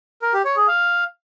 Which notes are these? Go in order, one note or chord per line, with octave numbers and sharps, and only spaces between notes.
A#4
G4
C#5
G#4
F5